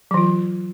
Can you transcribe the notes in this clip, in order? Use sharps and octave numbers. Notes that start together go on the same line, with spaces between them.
E3 F#3 F4